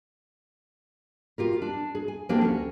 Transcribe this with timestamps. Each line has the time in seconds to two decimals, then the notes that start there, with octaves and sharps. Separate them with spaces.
1.38 F4 G4 A#4
1.62 D4
1.95 G#4
2.08 G#5
2.29 F3 A#3 D4 G4 A4 G5
2.41 D2 C#4